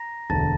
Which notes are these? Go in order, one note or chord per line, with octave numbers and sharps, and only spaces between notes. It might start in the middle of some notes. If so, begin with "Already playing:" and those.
Already playing: A#5 A#6
E1 D2 D3 A5 A6